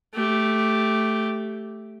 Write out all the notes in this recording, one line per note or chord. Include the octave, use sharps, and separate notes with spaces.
A3 G4